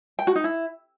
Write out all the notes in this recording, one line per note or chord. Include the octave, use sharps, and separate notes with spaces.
G5
F#4
D#4
E4